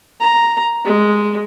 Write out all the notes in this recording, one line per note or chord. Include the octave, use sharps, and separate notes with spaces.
A#5
G#3